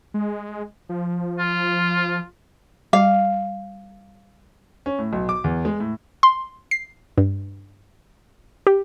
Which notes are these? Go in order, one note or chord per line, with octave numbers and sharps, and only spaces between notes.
G#3
F3
F4
G3 F5
C#4
A2
B1
D6
E2
G#3
A2
C6
C7
G2
G4